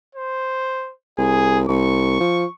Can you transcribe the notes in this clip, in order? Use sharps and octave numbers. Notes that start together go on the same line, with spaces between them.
C5
C2 G#4
C2 C#6
F3